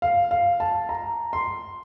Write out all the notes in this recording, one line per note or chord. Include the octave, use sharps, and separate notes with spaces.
F5
F5
A5
A#5
C6